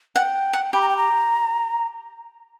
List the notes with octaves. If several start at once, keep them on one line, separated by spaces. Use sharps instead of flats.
F#5 G5
F#5
G4 B5
A#5
G5
A#5